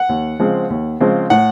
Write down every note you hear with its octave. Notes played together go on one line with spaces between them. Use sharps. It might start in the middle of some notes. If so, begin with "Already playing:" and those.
Already playing: F#5
D#2
C#3 F3 G#3 C4
D#2
C#3 F3 G#3 C4
A2 F#5